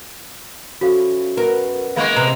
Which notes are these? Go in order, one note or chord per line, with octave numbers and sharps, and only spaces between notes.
F3 C#4 E4 F#4 A4 F5
F#2 B2 B3 A#4
C#3 E3 G#3 A#3 B3 F5 C#6
C3 B4 A#5